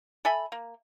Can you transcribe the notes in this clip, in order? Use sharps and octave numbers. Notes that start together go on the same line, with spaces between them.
A4 E5 G#5 B5
A#3